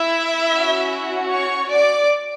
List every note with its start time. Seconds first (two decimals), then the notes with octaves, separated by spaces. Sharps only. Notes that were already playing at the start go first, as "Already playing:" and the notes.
Already playing: E4 E5
0.50 C#4 F#4
1.30 C#5 C#6
1.71 D5 D6